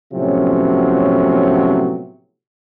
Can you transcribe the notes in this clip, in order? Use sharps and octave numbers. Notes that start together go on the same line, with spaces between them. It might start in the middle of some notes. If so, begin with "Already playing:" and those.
A2 C3 F3 F#3 B3 C#4